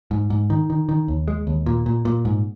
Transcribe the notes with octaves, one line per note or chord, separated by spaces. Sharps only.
G#2
G#2
D#3
D#3
D#3
D#2
G#3
D#2
A#2
A#2
A#2
G#2